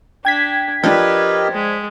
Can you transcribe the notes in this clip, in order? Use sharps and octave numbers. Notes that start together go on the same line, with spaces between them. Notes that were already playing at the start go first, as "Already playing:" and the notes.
D4 G5 G#6 B6
F3 D4 G4 A#4 B4 D#5
G#3